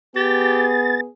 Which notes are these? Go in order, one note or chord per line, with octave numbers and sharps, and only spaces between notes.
B3 G4 G#4 A6